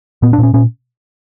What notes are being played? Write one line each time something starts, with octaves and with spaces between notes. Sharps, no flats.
A#2 B3
D4
A#2 C#4
A#2 C#4